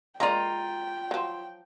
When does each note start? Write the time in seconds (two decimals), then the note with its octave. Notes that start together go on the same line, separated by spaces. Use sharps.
0.20 G#3 A#3 F4 D5 G5 A#5
1.11 F3 F#3